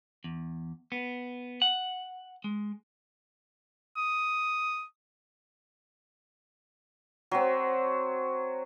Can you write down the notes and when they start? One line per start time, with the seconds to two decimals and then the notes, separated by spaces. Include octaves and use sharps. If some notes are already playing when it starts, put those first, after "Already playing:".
0.24 E2
0.92 B3
1.62 F#5
2.44 G#3
3.97 D#6
7.31 F#3 C4